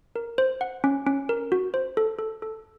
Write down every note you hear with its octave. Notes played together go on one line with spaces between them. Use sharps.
A#4
C5
F#5
C#4
C#4
A#4
F#4
C5
A4
A4
A4